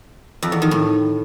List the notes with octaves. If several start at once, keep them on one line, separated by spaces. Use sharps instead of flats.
F2
E2
D#3
A2